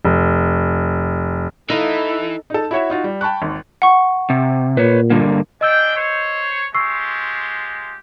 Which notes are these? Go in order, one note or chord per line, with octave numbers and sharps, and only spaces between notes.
F1
E3 D#4 E4 A4 F5
D#4 A4
E4 F#4 C#5 E5
D#4 F4 F#4
G3
G5 A5 B5 C#6 F#6
G#1 D#2
F#5 C#6
C3
A#2 B4 C#5
G2 D3 A#3
G#3 D4 D#5 G5 E6 G6
C5 C#5
G#3 F4 G4 C#6 E6 C7